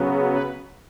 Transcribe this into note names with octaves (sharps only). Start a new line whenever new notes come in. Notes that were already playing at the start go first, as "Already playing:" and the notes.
Already playing: C#3 F#3 B3
B4